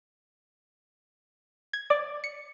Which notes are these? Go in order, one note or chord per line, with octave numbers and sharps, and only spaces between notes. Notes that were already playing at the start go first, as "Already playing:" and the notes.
G#6
D5
C#7